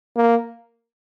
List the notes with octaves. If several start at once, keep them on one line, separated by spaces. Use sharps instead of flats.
A#3